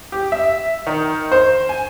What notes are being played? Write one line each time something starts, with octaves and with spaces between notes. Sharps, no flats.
G4
E5
D#3
C5
G#5